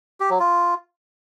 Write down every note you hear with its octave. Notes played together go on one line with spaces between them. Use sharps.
G4
F#3
F4